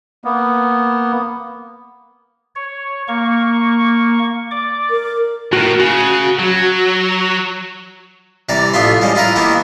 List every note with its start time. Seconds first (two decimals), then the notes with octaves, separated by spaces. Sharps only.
0.25 A#3 B3
2.56 C#5
3.08 A#3 C#6
4.51 D5 D6
4.91 A#4
5.53 A2 F#4 A#4
5.80 C#3 F#4
6.39 F#3
8.49 C3 E3 G3 D5 A#5
8.73 A1 F3 B3 F4 E5 C6
9.01 F3 G3 G#3 C#4
9.15 E4 F4 A#4 B4 A#5
9.35 D#3 E3 A#3 B3 E4 G4